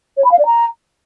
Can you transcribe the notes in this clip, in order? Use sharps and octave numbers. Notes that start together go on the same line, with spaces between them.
C#5
B5
F5
D5
A#5